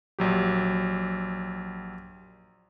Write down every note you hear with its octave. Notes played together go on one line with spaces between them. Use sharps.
A#1 F#3 G4